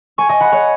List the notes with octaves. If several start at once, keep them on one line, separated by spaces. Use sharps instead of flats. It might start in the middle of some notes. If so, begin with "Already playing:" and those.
G#5 C#6
D#5 G#5
F#5 B5
C#5 F#5